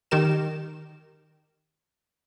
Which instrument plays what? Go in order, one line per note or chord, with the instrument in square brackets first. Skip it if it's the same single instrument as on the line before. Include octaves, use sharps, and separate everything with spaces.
[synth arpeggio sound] D#3 G4 A#4 E7